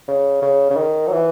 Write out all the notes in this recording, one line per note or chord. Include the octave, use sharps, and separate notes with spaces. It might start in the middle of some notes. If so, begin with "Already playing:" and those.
C#3
C#3
C#3
D#3
F#3
E3